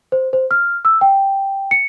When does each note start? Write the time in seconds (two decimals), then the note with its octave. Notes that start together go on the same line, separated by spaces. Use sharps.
0.12 C5
0.33 C5
0.51 F6
0.85 E6
1.01 G5
1.71 C#7